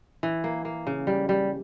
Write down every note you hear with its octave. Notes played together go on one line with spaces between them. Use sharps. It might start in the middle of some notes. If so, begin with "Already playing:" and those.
E3
A#3
A#3
C#3
G3
G3